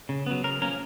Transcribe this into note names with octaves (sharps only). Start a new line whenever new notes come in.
C#3
F#3 B3
C#3 A#4
F3 A#3 C#4 A#4